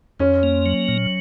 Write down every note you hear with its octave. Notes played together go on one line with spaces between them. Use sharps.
F2 C#4
A#3
F#3
A#2